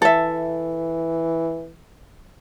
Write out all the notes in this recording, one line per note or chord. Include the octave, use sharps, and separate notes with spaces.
E3 A4 E5